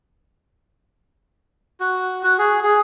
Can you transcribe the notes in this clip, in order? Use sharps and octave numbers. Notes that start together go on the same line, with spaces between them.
F#4
F#4
G#4
G#4